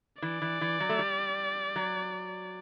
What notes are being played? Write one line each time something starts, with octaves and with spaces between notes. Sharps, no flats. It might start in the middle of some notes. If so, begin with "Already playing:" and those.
E3 D5
E3
E3
F#3
A3
G3
F#3